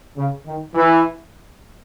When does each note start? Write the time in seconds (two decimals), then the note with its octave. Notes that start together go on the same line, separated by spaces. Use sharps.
0.17 C#3
0.46 D#3
0.75 E3